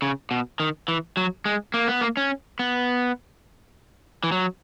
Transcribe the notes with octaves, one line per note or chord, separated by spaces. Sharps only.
C#3
B2
D#3
E3
F#3
G#3
A#3
B3
A#3
C#4
B3
E3
F#3